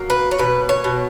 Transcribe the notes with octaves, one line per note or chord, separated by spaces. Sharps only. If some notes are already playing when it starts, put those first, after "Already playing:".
Already playing: F#3 A#3
B4
C#5
B2 B4
C#5
B2